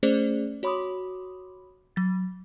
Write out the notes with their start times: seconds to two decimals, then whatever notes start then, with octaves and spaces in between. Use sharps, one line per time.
0.03 A3 C#4 G#4 C5 D5
0.63 F#4 C#5 B5 C6 D6 D#6
1.96 F#3 A6